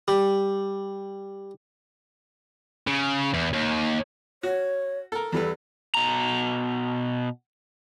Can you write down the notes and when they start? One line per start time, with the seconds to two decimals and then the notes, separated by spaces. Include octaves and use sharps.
0.08 G3
2.87 C#3
3.34 E2
3.54 D#2
4.43 F#4 C#5
5.12 A4 A#4
5.32 E2 G3 A4 B4
5.95 B2 A#5